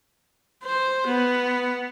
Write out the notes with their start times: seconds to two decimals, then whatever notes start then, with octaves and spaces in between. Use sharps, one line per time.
0.64 C5
1.07 B3